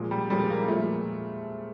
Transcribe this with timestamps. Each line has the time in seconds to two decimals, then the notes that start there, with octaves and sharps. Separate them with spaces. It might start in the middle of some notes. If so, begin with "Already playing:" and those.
Already playing: A#2 F3 G#3
0.11 G3
0.30 A#2 F3 G3 G#3
0.50 A#3
0.68 A#2 F3 G#3 A3